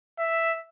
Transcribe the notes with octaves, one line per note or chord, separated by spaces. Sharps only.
E5